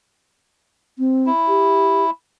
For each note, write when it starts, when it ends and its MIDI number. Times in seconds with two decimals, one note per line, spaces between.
0.99 1.29 60
1.26 2.10 64
1.48 2.05 67